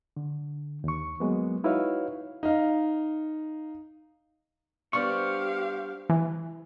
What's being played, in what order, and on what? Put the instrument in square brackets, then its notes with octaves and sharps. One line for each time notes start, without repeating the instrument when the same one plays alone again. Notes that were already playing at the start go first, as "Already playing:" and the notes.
[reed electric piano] D3
D#2 C#6
F#3 G#3 A#3 B3
D#4 E4 F#4 B4 C#5 F5
[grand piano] D#4 F5
[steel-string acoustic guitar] G3 B3 D4 [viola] G4 F5 [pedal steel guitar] C5 C#6
[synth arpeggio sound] E3